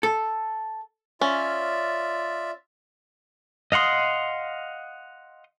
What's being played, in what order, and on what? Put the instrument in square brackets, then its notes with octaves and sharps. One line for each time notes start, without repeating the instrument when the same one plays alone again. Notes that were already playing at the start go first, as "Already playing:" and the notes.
[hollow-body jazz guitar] A4
[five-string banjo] C#4 [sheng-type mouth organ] F4 D5 E5
[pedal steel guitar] D#5 F5 F#5 C6 D#6